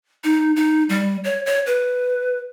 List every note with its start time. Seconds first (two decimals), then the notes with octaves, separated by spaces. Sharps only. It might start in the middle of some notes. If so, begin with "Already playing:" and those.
0.24 D#4
0.56 D#4
0.89 G3
1.24 C#5
1.46 C#5
1.66 B4